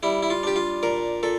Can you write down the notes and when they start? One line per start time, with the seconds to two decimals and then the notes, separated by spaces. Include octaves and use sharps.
0.03 G3 E4
0.22 E4
0.30 F4
0.43 D4 G4
0.56 F4
0.83 A#2 A#4
1.23 A#2 A4